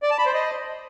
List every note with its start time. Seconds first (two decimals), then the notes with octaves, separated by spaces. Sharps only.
0.03 D5
0.11 A5
0.18 B5
0.26 C5
0.34 D#5